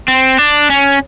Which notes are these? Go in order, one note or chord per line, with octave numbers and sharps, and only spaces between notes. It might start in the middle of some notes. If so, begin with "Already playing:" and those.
C4
D4
C#4